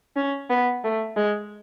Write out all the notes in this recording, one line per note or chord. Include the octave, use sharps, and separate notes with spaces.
C#4
B3
A3
G#3